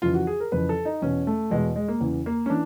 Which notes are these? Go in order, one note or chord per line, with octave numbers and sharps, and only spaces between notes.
F2 C#3 E3 F4
F#4
G#4
A#4
F2 C#3 E3 B4
A4
D#4
E2 B2 C#4
A3
E2 B2 G#3
G#3
A#3
E2 C#3 E3
A#3
C#4
E3 D4